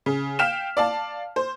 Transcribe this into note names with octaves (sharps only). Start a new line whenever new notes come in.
C#3
F5 G5 F6 B6 E7
D5 F5 A5
C5